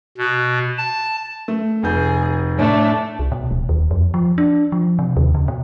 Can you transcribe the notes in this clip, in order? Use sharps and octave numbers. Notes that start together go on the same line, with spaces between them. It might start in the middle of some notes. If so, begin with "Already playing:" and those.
B2
A5
A3
F1 G#4 G6
A2 A3 D4
C2
B2
D1
D#2
F2
F3
D4
F3
C3
D#2
C#3
B2